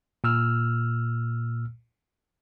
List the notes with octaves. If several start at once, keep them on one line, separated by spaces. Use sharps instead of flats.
A#2 E6 F6